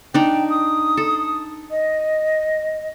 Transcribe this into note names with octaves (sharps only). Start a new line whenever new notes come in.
D4 D#4 G5
D#6
A4
D#5